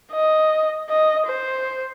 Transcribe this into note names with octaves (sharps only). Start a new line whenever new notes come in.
D#5
D#5
C5